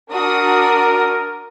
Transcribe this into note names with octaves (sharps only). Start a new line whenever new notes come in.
D4 F#4 A#4 D#6